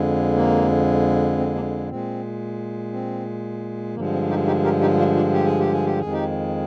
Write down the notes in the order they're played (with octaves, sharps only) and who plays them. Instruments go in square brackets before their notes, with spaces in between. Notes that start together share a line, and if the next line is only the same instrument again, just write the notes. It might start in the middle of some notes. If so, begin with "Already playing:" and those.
Already playing: [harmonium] F2 D3 G#3
A#3
C4
A#3 D4
A#2 G#3 C4
C4
G2 D3 F3 G#3 A#3
C4
D#4 G4
D#4 G4
G4 A#4
D#4 G4
D4 F4
D4 F4
G4
G#4
G4
G#4
G4
F2 D#3 G#3 G#4
D#4 G4